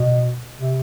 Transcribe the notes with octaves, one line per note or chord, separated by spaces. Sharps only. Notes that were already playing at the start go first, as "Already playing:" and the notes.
Already playing: B2
C3